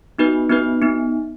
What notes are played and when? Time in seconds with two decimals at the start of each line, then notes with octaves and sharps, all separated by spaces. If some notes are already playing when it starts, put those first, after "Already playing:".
0.18 B3 D#4 F#4 B4
0.50 B3 D#4 F#4 B4
0.82 B3 D#4